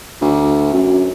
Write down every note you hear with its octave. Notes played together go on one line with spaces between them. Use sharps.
D2
F#2